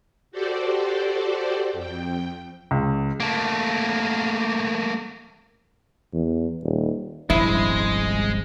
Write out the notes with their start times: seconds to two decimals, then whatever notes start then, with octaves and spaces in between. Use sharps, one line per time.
0.32 F#4 G4 A4 C5 D5
1.73 F2 G5
2.71 C#2
3.20 A3 A#3
6.13 E2
6.63 D#1
7.30 D#1 G#1 F3 G#3 E4